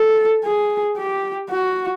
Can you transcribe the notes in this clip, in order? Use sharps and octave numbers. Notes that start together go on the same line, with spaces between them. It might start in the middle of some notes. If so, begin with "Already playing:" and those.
Already playing: A4
G#4
G4
F#4